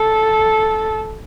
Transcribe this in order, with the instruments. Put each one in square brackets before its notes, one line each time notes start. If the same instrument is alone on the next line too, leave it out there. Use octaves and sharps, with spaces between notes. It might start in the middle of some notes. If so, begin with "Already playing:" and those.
Already playing: [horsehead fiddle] A4